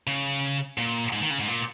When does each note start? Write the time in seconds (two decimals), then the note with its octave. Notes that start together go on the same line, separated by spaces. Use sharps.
0.07 C#3
0.78 A#2
1.12 G#2
1.22 D#3
1.30 C#3
1.40 G#2
1.48 A#2